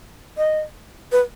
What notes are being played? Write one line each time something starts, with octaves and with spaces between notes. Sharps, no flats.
D#5
B4